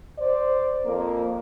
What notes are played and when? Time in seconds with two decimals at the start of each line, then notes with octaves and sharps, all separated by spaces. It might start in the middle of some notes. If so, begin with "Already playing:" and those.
0.18 C5 D5
0.86 F2 A#3